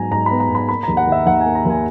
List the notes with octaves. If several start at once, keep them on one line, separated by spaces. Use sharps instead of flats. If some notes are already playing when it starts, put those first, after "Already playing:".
Already playing: G#2 F#3 B3 G#5 A#5
G#2 A#5
B3 B5
A#5
G#2
B5
A#3 B5
D#2 A#5
F#5
D#3 E5
D#2 F#5
G#5
A#3
A#5
D#2 G#5